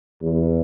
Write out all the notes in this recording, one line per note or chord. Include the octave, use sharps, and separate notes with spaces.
E2